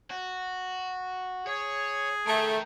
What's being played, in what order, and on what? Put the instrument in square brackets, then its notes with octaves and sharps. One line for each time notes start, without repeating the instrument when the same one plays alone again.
[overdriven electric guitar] F#4
[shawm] G#4 [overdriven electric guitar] C#5
[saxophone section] A3 [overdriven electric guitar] A#4 G5